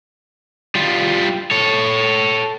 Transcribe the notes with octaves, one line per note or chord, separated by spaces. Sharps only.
G3 F4
A4 C#5